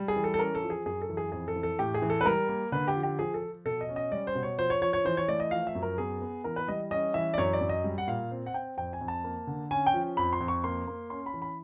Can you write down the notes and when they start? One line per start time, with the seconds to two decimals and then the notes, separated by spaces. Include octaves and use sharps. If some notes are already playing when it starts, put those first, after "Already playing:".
Already playing: G3
0.08 G#4
0.16 E3
0.24 A4
0.34 A4
0.39 C#4 A#4
0.55 A4
0.63 F3
0.70 G#4
0.86 F#2 G#4
1.02 A4
1.09 E3
1.17 G#4
1.32 F2 G#4
1.48 A4
1.56 E3
1.63 A4
1.79 A2 G4
1.94 G#4
2.02 E3
2.10 A4
2.21 B4
2.25 G3 A#4
2.49 A#3
2.72 D3 B4
2.88 G4
2.95 F3
3.03 G4
3.19 F3 G#4
3.34 A4
3.42 F3
3.65 B2 A4
3.81 D#5
3.89 C#4
3.96 D#5
4.12 G3 D5
4.27 C5
4.35 B2
4.43 C#5
4.58 F3 C5
4.70 C#5
4.82 F3 C#5
4.93 C#5
5.05 E3 C5
5.17 C#5
5.28 A3 D5
5.40 D#5
5.51 F3 F5
5.67 E5
5.75 F#2
5.82 A#4
5.98 B3 G#4
6.22 B3
6.44 E3 A#4
6.56 B4
6.68 G3 D#5
6.91 C#4 D#5
7.14 E3 E5
7.34 D5
7.38 F#2 C#5
7.53 D5
7.61 F#2
7.69 D#5
7.84 G3
7.98 F#5
8.07 A#2 F5
8.31 C4
8.46 F#5
8.54 C4 G5
8.77 F2 G5
8.93 G#5
9.01 F2
9.08 A5
9.24 A#3
9.47 D3
9.71 C#4 G#5
9.86 G5
9.94 F3
10.17 F2 B5
10.33 C6
10.41 F2
10.48 C#6
10.64 A#3 C6
10.87 A#3
11.10 C#4 C6
11.26 B5
11.34 E3
11.42 B5